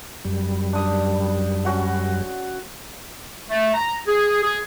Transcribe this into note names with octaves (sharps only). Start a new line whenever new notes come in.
F#2 G3
D4 D#6
C#4 F#4 F#5
A3
A#5
G#4
G#4